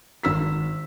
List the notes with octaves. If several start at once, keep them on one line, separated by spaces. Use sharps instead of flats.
G#1 E6 B6